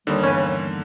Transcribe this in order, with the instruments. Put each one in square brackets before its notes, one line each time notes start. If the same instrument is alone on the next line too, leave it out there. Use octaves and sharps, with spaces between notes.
[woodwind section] D#2 G3 [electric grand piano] D3 A#3 [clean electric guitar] D#3
[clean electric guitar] E2 G2 D#3 [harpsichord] C#4 B4